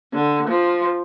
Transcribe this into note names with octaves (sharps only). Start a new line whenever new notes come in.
D3
F3